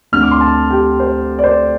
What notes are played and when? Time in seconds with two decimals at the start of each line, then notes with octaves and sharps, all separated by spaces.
0.12 D2 D3 A3 C4 F6
0.23 D6
0.31 C6
0.41 A5
0.70 G4
1.00 C5
1.39 D5
1.44 C5